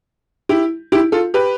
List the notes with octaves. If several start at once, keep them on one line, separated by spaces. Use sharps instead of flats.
E4 G4
E4 G4
F4 A4
G4 B4